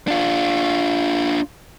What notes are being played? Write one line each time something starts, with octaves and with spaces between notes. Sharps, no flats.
D4 F4